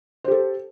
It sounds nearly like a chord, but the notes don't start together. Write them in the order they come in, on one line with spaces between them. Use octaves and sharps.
C5 G4 A4